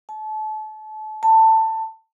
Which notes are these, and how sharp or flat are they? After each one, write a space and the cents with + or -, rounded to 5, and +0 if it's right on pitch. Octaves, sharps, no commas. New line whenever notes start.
A5 -30
A5 +15